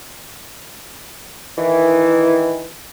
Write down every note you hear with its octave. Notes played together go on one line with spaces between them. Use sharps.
D#3 E3